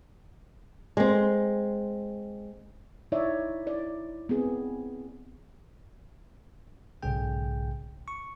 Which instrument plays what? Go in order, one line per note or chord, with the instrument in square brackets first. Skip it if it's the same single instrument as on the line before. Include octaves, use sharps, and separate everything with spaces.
[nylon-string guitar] G#3 C4
[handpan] D#4 E4 C#5 D5 E5
E4 D5
B3 C4 G#4
[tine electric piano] B1 G#2 C#3 G#4 G5
C#6